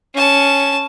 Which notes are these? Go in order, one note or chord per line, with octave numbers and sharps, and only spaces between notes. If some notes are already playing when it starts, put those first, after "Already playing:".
C#4 A5